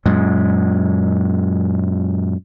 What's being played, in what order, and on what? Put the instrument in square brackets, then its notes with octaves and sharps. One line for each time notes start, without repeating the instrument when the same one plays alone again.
[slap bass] F#2 A#2 G#3